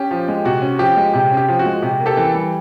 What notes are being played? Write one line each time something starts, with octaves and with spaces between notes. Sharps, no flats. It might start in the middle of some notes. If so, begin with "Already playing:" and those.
Already playing: C#4 G4
F3
G#3
C3 F#4
C#4
F3 G4
G#3
C3 G4
C#4
G4
F3
F#4
G#3
C3 G4
A#3
G4 A4
E3
G3